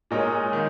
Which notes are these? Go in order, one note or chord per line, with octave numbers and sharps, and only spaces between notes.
A#2 G#3 D#4 A#4 C#5
D#3